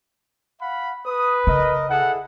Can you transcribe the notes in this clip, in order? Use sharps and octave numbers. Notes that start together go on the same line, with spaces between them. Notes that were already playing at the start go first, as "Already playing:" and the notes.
F5 F#5 B5
B4 D#6
C#3 A#4 D#5
E4 G#4 A4 F#5